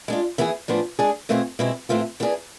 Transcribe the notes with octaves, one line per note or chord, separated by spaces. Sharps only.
G#3 D4 F4
E3 B3 E4 G#4
A2 F3 B3 D4 G#4
G#3 D4 G#4
B2 A3 C4 F4 G#4
B2 G#3 C4 E4
A2 E3 A3 C4 F4
E3 B3 D4 G#4